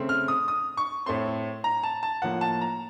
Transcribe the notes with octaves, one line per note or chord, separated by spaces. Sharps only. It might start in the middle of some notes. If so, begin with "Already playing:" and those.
Already playing: C#3 A3 C4
F6
D#6
D#6
C#6
A2 A3 C4 C6
A#5
A5
A5
A2 F3 A#3 F#5
A5
A#5